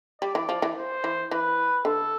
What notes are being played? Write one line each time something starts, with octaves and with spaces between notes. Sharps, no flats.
G3 D5
E3
F3
E3
C5
E3
E3 B4
D3 A4